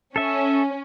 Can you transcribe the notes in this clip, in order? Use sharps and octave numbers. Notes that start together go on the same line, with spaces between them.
C#4 A4 E5